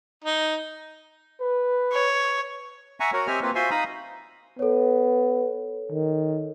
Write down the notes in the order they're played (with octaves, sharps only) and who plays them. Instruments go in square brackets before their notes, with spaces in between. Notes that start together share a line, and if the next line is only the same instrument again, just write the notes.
[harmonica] D#4
[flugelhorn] B4
[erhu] C#5
[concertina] E5 F#5 G#5 A#5 C#6
F#4 A#4 C#5 F#5
C4 G4 D#5 E5 G#5 F6
A#3 C4 F4 B4
F4 F#4 C5 E5 G#5 C6
D#4 F5 A#5 B5 D#6
[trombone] B3 [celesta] A4 C#5
[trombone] D#3